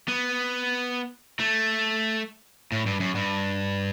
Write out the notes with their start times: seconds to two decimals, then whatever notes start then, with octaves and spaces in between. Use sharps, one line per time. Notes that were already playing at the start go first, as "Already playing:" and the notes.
0.08 B3
1.39 A3
2.72 A2
2.86 G2
3.00 F#2
3.15 G2